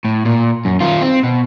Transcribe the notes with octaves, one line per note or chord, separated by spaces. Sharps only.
A2
A#2
F#2
D#3 F4
C4
B2